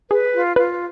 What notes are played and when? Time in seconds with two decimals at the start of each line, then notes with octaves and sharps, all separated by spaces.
0.10 G#4 B4
0.33 F4
0.55 F4 B4